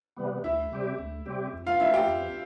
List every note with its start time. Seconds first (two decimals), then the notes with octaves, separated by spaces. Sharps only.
0.17 C3 E3 G3 B3
0.44 D2 E4 E5
0.72 C3 G3 C4 G4
0.99 D2
1.26 C3 G3 C4 G4
1.53 F2
1.67 F4 F5
1.80 E3 A3 D4 E4 E5
1.93 G4 G5
2.07 F2